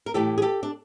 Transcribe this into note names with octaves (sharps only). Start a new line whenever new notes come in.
A#4
A2 E3 G4 A4
G#4
G4 A4
D4